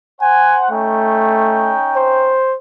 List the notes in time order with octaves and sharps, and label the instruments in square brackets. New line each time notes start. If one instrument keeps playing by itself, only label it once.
[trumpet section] C5 F#5 [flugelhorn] G#5
[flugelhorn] A3 [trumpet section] C#4 D#4 G5
[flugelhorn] C5